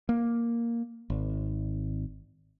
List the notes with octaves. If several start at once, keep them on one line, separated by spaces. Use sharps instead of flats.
A#3
G#1